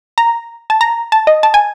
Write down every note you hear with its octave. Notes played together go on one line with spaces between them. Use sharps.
A#5
A5
A#5
A5
D#5
A5
G#5